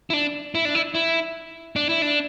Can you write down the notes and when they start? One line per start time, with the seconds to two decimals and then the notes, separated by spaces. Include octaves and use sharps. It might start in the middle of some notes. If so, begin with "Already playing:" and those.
0.10 E4
0.13 D4
0.55 E4
0.65 D4
0.75 E4
0.95 E4
1.76 D4
1.89 E4
2.02 D4